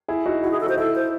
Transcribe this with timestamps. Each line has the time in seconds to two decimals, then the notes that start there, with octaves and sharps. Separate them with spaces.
0.08 E4 G#4
0.26 D#4 F#4
0.43 E4 F#4
0.51 G#4
0.54 E4
0.60 A4
0.66 D#4 F#4 C5
0.78 E4 A4
0.95 C5